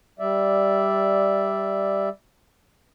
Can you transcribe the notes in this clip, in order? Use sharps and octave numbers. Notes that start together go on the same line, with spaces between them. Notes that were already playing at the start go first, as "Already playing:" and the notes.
G3 D5 E5